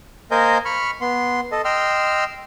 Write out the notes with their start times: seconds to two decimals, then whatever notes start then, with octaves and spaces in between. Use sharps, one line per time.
0.31 A#3 A#4 C5 D#5 G#5 G6
0.65 B5 C#6 F6
1.01 B3 C6
1.52 A4 D#5
1.65 D#5 G5 C6 E6 F6